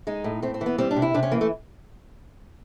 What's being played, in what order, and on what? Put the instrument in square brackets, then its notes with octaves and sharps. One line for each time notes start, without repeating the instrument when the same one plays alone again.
[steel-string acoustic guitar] G#3 D#4
A2
A2 C4
C4
E3
B3
G3 C4
D4
C3
E4
C3 D4
C#4
E3 A#3
A3